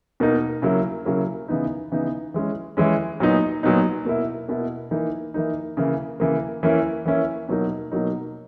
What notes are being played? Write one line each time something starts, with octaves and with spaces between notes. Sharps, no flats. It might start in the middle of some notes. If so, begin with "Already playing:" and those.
B2 A#3 D#4
C#3 F#3 A#3 E4
C#3 F#3 A#3 E4
C#3 E3 B3 D#4
C#3 E3 B3 D#4
E3 G#3 C#4
E3 G#3 C#4
A#2 F#3 B3 D#4
A#2 F#3 B3 D#4
B2 A#3 E4
B2 A#3 E4
E3 A#3 D#4
E3 A#3 D#4
C#3 E3 A#3
C#3 E3 A#3
E3 A#3 C#4 E4
E3 A#3 C#4 E4
B2 F#3 A#3 D#4
B2 F#3 A#3 D#4